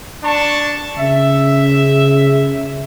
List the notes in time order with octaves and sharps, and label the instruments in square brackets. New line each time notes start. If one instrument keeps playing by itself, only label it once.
[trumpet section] D4 A5 C#6
[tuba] C#3 [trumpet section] E5